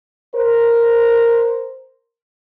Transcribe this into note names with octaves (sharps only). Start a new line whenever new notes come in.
A#4 C5